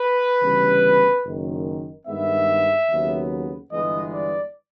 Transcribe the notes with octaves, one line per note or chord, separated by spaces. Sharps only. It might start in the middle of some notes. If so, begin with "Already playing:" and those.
Already playing: B4
D2 C#3 E3 G3 B3
F#1 F#2 D#3
G2 D#3 G#3 B3 E5
D#2 C#3 F#3 B3
G1 G2 E3 G#3 B3 D#5
D5